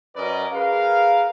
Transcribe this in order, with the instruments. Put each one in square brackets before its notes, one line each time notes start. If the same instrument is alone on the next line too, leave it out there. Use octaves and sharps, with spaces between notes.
[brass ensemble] F#2 C#4 A#4 B4 D5 D#5
G#4 A#4 B4 F5